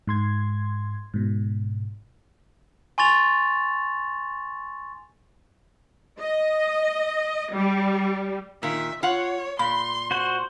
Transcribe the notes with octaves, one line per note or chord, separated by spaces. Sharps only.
G#2 C6 G#6
G#2 B2
G#5 C6 C#6 A6 F7
D#5
G3
A#2 D#3 E5
F4 C#5 F#5
A#2 B5 C6
F#4 C5